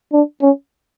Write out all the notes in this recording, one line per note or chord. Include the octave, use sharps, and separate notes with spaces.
D4
C#4